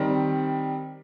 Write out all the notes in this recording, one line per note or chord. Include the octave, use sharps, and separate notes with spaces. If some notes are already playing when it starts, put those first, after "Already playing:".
Already playing: D#3 G3 C4